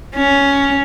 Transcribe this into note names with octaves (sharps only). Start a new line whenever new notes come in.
C#4